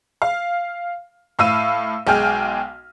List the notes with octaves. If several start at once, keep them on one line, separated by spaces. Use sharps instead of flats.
F5
A2 F5 E6 D#7
B1 G#3 G5 G#5 F6